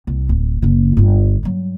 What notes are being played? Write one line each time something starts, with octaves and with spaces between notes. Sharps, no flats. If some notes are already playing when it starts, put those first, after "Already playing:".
C2
D1
F#1 C#3
G1 F4
G2 F#3